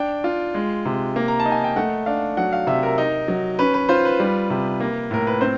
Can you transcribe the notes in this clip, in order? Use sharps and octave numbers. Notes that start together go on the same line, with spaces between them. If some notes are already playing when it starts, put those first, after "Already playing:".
Already playing: D4 G5
F4
G#3
C3
A#3
A#5
A5
D#4
G#5
G5
A3 F#5
D4 F5
F#3 F#5
F5
C3 E5
A#4
D#4
F#3
C#4 B4
B4
F4 C5
B4
G3
C3
A#3
A2 A#4
B4
C4 C5